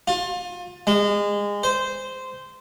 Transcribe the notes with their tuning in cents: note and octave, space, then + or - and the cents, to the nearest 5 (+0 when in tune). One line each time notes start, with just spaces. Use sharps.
F4 +30
G#3 -25
C5 -15